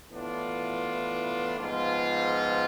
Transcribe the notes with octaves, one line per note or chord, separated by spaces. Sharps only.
A2 E3 B3 D4 F4
G#2 F3 B3 F4